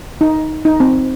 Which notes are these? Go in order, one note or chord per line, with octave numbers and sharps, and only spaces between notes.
D#4
D#4
C4